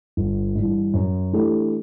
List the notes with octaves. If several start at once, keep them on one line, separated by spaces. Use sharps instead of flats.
G1
G2 E3
F#2
E3 A3 D4 G4